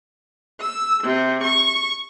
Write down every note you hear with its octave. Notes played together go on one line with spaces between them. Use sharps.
E6
C3
C#6